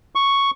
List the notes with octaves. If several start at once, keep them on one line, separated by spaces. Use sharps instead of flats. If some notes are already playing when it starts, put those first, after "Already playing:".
C#6